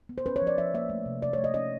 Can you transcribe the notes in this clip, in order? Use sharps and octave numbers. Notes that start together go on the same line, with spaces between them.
B3
C5
C#4 B4
C#5
F3
D5
F3 E5
A#3 E5
A3
C3
C3 D5
A3 C#5
D#5
C#4 D#5